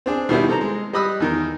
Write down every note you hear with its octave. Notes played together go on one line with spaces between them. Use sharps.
C4 D4 G#4
B2 D#3 G3 E4
C3 A4 C5 A#5
G#3
G3 D#5 B5 D#6 E6 F#6
E2 D#3 A#4